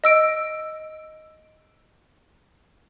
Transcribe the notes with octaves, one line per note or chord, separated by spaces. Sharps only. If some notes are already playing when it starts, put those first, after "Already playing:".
D#5 E6 D7